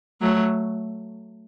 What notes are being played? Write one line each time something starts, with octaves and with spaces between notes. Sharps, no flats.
F#3 A3